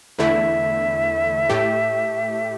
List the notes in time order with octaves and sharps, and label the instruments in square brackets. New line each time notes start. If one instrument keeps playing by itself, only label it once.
[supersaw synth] E2 D3 A3 E4 [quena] E5
[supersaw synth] A2 A3 G4